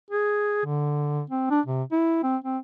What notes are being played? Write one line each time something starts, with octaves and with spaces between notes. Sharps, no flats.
G#4
D3
C4
D4
C3
E4
C4
C4